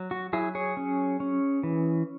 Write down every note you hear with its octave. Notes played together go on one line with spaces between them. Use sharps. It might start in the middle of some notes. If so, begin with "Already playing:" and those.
Already playing: F#3
F#4
F#3 E4 G#4
G#4 C#5
C#4
C#4
E3